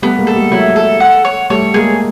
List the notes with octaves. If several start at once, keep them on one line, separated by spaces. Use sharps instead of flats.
G3 A3 B3
G#3 A#3
A4
G3 A3
F#3 G#3 E4
A4
F#5
C#5
G3 A3 C#5
G#3 A#3 G#4